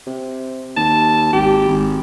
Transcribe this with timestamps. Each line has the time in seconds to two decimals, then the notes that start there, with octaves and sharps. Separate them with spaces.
0.07 C3
0.77 D#2 A5
1.33 G#1 G4
1.69 G#1